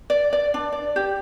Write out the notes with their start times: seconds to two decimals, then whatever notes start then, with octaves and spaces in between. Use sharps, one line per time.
0.10 D5
0.33 D5
0.54 D4
0.73 D5
0.96 G4